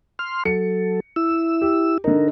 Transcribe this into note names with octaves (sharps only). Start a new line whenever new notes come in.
C6 F6
F#3 A4 C#7
E4 E6
G4
D3 D#4 A#4